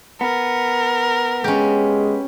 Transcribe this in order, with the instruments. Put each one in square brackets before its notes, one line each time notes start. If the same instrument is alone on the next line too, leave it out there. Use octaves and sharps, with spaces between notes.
[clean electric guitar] B3 [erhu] A#4
[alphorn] G#3 [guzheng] C#4 G4